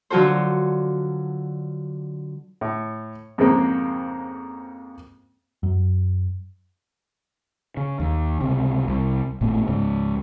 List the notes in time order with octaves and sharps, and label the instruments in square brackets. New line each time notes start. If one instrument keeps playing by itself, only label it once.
[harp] D3 F#3 F4 F#4 A4 C5
[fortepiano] A2
F2 G#2 C#3 G#3 A#3 C4
[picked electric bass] F#2
[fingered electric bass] C#3
D#2
C#2 C3
C2
G#1 A2 A3 B3
C#2 G#2 C#3